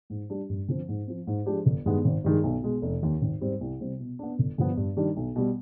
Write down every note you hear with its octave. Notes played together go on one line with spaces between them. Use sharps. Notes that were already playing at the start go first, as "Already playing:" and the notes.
G#2
G3 D4 G4
G2
D3 F3 C4
G#2
F3 C4
G#2
F3 G#3 D4 G4
G1
G2 D#3 G#3 B3
G#1
G2 D#3 G#3
B1
B2 G#3
F1
D#2 D#3
G#1
G#2 G3 C4
C2
C3 G3 C4
B2
B3 D4
G1
G2 D3 F3 B3
G2
D#3 G3 D4
B1
B2 G3